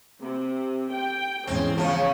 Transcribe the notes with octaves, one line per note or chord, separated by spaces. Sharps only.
C3
G5
E2 G#2 C#3 C4
C#3 F3 C#5